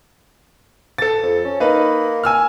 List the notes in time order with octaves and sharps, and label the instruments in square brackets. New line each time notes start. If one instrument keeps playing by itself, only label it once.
[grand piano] A4 A6
[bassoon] F2
C#4
[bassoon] A#3 [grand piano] D#4 B4
[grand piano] G#5 E6 F6